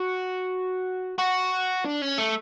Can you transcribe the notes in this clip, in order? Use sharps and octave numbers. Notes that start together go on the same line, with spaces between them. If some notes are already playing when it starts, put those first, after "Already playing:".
Already playing: F#4
F#4
D4
C#4
A3